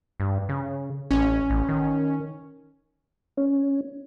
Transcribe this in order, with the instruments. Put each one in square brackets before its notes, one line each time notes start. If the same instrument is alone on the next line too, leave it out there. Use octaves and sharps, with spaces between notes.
[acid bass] G2
C#3
[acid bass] A1 [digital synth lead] C#4
[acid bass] A1
D#3
[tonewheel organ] C#4